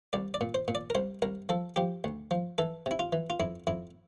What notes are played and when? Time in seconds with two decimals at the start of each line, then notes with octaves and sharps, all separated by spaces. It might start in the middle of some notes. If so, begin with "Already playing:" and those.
0.13 C2 D5
0.34 D5
0.41 A#2
0.54 C5
0.68 A#2
0.75 D5
0.90 A#4
0.95 C2 C5
1.22 C2 A#4
1.49 F3 A4
1.76 F3 G4
2.04 D2
2.31 F3
2.58 E3 A4
2.86 C3 E4
2.99 F4
3.13 E3
3.30 F4
3.40 F2 E4
3.67 F2 E4